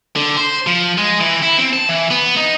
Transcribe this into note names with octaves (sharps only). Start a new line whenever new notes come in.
D3
C5
F3
G#3
E3
E4
C4
A5
E3
B3
D#4